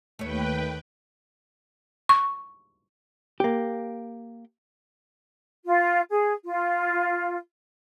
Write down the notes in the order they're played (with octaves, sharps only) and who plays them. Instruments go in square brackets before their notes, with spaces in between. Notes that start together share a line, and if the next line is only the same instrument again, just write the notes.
[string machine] D#2 B4 G5 [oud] A3 C#5
[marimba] C#6
[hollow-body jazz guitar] A#3 G4
[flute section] F4
G#4
F4